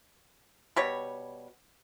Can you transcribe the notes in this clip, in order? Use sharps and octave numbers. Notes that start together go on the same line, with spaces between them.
B2 G3 C#5